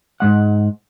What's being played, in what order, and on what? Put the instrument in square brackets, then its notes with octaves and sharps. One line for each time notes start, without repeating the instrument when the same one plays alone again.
[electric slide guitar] G#2 G#3 F#5